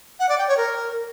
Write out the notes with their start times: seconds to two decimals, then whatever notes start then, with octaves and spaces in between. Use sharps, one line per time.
0.20 F#5
0.29 D5
0.38 G5
0.48 C#5
0.57 A#4